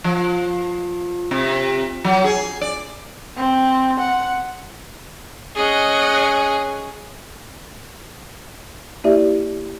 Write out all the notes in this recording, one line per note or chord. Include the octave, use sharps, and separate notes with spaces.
F3
C3
F#3
G#4
D5
C4
F#5
C#4 G#4 D#5 F#5
A#3 E4 G4 D5 E5